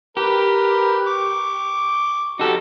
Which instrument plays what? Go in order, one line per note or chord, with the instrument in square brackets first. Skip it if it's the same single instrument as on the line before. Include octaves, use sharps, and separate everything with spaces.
[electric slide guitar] G4 [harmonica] A#4 B4
[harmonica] C#6 D6
[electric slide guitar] D#4 A4 [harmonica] F#4 G4